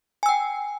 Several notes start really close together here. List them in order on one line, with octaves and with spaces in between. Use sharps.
G#5 E6 G5